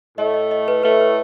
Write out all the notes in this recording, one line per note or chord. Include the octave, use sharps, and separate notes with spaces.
A2 A3 D#5
D#5
D#5
B4
A2 A3 B4
B4